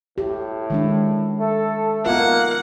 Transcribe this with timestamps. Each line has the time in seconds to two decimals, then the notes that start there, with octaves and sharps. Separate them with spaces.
0.18 A2 G4
0.70 D#3 G#3 D4
1.40 A3 A4
2.06 D#3 A#3 B3 F4 F#5